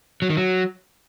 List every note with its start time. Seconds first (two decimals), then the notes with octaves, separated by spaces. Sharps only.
0.22 F#3
0.30 D#3
0.37 F#3